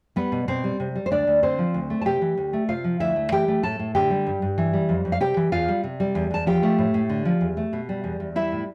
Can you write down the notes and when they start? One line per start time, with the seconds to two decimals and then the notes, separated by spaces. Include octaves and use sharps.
0.16 G3 B3 B4
0.32 B2
0.48 B2 C4 C5
0.64 G3
0.80 C3
0.96 G3
1.06 C5
1.11 D2 D4 D5
1.27 D2
1.43 D3 C4 C5
1.59 F3
1.74 D2
1.90 A3
2.01 A5
2.05 C3 G4 G5
2.22 E3
2.37 D2
2.53 A3
2.69 C3 F4 F5
2.84 F3
3.00 D2 E4 E5
3.16 A3
3.32 E3 G4 G5
3.48 A3
3.63 A2 A4 A5
3.79 A2
3.95 D3 G4 G5
4.10 G3
4.27 G2
4.42 G2
4.58 E3
4.73 G3
4.89 F2
5.05 F2
5.12 F5
5.20 C3 G4 G5
5.37 E3
5.52 E2 F4 F5
5.68 G3
5.84 C3
6.00 G3
6.15 E2
6.31 E2 A5
6.46 F3 G4 G5
6.63 A3
6.78 A2
6.94 A2
7.09 D3
7.25 F3
7.41 E2
7.57 A3
7.73 B2
7.89 G3
8.04 E2
8.20 E2
8.35 G3 E4 E5
8.52 A2